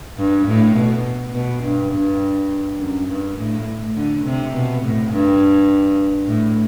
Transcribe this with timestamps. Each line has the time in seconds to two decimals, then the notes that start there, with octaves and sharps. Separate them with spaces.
0.18 G2
0.47 A2
0.76 B2
1.34 B2
1.64 G2
1.92 G2
2.80 F#2
3.08 G2
3.37 A2
3.96 D3
4.25 C3
4.54 B2
4.82 A2
5.12 G2
6.27 A2